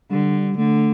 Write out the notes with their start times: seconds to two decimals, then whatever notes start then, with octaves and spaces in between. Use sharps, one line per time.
0.11 D3 G3
0.58 D3 A3